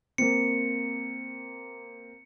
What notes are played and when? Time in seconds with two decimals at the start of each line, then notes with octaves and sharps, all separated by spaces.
0.18 A#3 C4 C#7